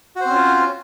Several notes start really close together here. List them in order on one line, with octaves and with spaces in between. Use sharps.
F#4 C5 C4 C#4 F4